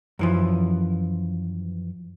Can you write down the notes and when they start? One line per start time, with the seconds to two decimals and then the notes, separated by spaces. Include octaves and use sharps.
0.19 F#2 E3 F3